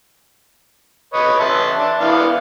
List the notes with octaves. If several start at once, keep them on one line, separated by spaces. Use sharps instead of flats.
B4 C#5 D#5
E5 A5 C6
D4
E3 B3 F5